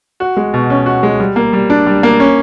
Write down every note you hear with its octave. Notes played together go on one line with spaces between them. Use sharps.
F#4
G#3
B2
C#4
F#4
G#3
G3
A#3
G3
D4
G3
A#3
C#4